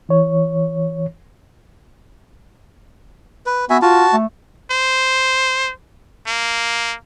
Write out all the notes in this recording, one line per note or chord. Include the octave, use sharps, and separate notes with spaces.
E3 C#5
B4
B3 F#4 E5 G#5
F4 F#4 A5
A3
C5
A#3